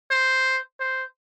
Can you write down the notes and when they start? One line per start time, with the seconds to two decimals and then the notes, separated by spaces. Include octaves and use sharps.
0.11 C5
0.80 C5